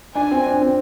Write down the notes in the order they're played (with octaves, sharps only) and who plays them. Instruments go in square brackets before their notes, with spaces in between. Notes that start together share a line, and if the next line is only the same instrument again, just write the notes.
[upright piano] D4 [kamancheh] G#5
[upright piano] C4
D4
C4